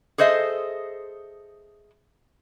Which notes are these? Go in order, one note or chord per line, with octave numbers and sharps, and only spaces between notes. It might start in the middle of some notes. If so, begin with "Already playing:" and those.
G#4 A4 C5 D#5 E5